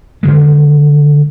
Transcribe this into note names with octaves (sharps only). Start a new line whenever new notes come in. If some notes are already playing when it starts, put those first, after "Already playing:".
D3 D#3 G#3